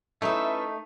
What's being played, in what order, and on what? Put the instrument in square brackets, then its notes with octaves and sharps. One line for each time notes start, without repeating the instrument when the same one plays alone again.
[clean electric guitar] A3 D#4 [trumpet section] C#4 E5 [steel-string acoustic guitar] E4 A4 B4